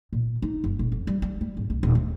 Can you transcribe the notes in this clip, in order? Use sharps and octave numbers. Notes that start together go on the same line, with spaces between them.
A#2
D#4
F#1
D#1
F2
G3
G3
G3
G#1
C2
D#1
A3